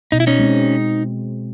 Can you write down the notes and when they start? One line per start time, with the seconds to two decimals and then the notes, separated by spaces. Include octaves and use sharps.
0.12 B2 D#4
0.20 E4
0.27 C#4 D#4
0.39 G#3 C4